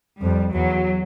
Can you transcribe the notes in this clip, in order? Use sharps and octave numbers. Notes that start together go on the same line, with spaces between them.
F2 G3
E2 F#3